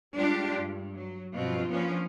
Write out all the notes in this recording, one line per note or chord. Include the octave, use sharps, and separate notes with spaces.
G3 G#3 D4 F4 G4
G2
F#3
G2 B2 F3 C4 F4
F3 A#3 B3 C#4 D4 F4